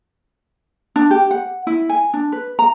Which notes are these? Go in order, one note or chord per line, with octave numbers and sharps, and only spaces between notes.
D4
G4
F#5
E4
G#5
D4
B4
A#5